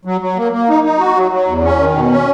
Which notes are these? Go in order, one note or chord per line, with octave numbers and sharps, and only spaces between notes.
F#3
F#3
A#3
A#3
D#4
D#4
F#4
F#3
F#3
E2
C#4
D#3
B2
C#4